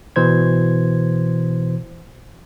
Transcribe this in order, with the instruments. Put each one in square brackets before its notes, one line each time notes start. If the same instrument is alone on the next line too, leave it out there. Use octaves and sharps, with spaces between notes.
[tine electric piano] B2 E3 C5 G#6